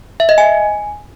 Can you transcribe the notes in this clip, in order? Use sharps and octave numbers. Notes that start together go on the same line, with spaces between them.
E5
D#5
G#5